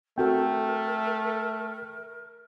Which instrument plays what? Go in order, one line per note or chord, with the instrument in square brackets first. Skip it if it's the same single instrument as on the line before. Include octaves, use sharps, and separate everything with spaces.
[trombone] A3 [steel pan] C4 F#4 A4 [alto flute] A#4 [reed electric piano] G5